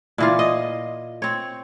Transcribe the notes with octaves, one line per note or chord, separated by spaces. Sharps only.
A#2 E3 F4
D#5
C4 C#5